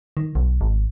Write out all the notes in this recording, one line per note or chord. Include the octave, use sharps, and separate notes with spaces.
D#3
B1
G#1